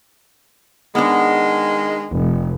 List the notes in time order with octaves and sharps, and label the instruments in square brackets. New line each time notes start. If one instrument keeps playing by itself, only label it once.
[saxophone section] D#3 G#3 [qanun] B3 D4
[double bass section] F1